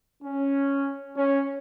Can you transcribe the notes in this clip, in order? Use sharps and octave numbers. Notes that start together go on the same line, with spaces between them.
C#4
C#4